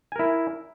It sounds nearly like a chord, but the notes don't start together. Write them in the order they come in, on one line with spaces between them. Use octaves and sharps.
G#5 A#4 E4